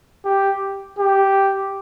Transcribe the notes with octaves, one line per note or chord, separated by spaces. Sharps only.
G4
G4